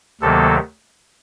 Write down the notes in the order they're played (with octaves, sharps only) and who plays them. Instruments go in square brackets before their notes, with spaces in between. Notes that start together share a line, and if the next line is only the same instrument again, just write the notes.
[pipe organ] D2 C3 D#3 F#3 A#3 A4